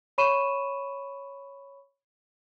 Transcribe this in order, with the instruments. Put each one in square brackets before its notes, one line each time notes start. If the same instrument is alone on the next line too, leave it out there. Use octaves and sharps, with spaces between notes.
[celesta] C#5 B5 C#6 D#7 E7